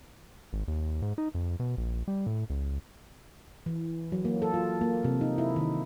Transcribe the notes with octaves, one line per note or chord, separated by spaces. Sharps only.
G#1
D#2
G#2
D#4
F2
B2
A#1
G3
A2
C#2
E3
F#3
A#3
A4
F4
A#3
C3
D#4
E4
D#3